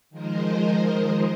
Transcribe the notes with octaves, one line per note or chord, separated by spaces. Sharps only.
D#3 F3 G#3 A#4 C5 D#5